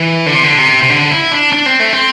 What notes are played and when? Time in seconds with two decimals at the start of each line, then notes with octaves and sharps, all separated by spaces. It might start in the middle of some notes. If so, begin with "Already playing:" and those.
Already playing: E3
0.26 D3
0.35 C3
0.43 D3
0.58 C3
0.83 C3
0.90 D3
1.11 E4
1.32 D4
1.53 D4
1.66 C4
1.80 A3
1.93 C4